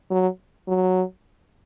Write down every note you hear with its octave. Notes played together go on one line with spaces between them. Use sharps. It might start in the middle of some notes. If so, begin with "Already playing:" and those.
F#3
F#3